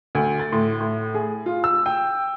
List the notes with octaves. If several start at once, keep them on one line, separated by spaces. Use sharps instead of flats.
D2
A6
A2
A2
G#4
F4
E6
G5